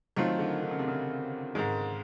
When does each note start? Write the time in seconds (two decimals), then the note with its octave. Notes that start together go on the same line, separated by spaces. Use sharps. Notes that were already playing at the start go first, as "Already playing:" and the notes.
0.16 D#3 F#3 A3 C4 F4
0.39 D3
0.62 D3
0.71 C#3
0.79 C3
0.88 C#3
1.55 G#2 D#3 G#3